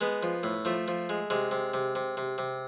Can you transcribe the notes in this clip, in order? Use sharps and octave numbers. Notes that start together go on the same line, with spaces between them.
G#3 B3
F3
A2
F3 A3
F3
G#3
C3 G#3
C3
C3
C3
C3
C3